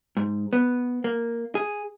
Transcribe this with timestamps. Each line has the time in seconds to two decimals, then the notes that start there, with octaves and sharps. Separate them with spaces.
0.17 G#2
0.53 B3
1.04 A#3
1.55 G#4